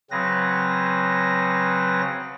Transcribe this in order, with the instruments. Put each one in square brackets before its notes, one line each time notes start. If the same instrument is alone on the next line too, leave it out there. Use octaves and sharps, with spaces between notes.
[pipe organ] C#3 F#3 C4 B4 A#6